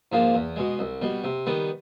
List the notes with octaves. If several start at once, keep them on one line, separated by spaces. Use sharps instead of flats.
G#2 F3 A#3 D4
E2
B2 G#3
C2
B2 G3
C3
D#3 G3 B3